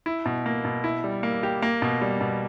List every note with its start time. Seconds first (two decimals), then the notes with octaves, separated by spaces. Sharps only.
0.06 E4
0.26 B2
0.46 A#3
0.65 B2
0.84 E4
1.04 G3
1.23 A#3
1.43 G4
1.62 A#3
1.82 B2
2.01 G3
2.21 B2